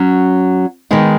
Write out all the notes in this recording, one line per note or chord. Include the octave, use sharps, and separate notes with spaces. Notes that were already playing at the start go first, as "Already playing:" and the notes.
Already playing: F#3 C#4 F#4
D#3 G#3 B3 D#4